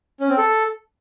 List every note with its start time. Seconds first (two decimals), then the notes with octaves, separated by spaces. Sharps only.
0.20 C#4
0.29 C4
0.38 A4